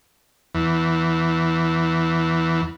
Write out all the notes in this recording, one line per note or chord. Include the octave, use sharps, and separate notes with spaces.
E2 E3